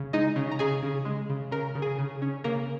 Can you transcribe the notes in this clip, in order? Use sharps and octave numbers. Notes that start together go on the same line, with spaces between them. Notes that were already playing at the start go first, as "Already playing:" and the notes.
Already playing: C#3
G#3 D#4 D#5
C#3
A#5
C#3 G#4 G#5
C#3
G#3
C#3
C#3 A#4 A#5
C#3
G#4 G#5
C#3
C#4
C#3 A#3 A#4